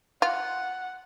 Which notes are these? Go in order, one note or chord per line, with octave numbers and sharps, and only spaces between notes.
F4 F#5